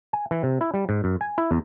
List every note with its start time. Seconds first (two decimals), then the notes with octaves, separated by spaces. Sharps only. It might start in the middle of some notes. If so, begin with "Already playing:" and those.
0.13 G#5
0.31 E3
0.43 C3
0.61 E4
0.74 G3
0.89 G#2
1.04 F#2
1.21 G#5
1.38 E4
1.51 E2